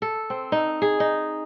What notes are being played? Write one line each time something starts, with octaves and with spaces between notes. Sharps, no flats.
A4
C4
D#4
G#4
D#4